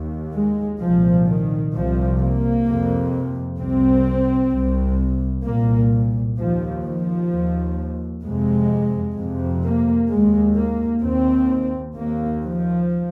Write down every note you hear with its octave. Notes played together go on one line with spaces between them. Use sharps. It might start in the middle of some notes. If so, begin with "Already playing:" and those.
Already playing: D#2
G#3
C2 A#2 F3
D#3
C2 C3 F3
A#3
F2 C3
C2 C3 C4
C2 C3
C2 A#2 A#3
D#2 F3
F3
D#2
F2 C3 G#3
F2 C3
A#3
D#2 G#3
A#3
D#2 C4
D#2 A#3
F3